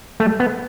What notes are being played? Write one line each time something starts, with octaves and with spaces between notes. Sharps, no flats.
A3
B3